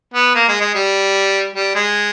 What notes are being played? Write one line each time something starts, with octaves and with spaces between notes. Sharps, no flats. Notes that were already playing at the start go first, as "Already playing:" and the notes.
B3
A#3
G#3
G#3
G3
G3
G#3